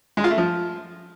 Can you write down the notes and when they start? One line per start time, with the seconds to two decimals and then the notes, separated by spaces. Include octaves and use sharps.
0.17 G#3
0.24 F4
0.31 A3
0.38 F3